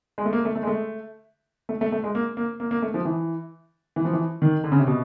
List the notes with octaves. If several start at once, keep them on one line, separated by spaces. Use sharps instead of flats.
G#3
A3
A#3
A3
A3
G#3
A3
A3
A3
A3
G#3
A#3
A#3
A#3
A#3
A3
F3
E3
E3
F3
E3
D#3
D3
C#3
C3
B2